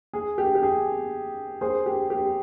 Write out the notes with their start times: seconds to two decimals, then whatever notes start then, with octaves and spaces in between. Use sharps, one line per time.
0.13 G#4
0.38 G4
0.55 G4
0.63 G#4
1.61 G#4 C5
1.86 G4
2.10 G4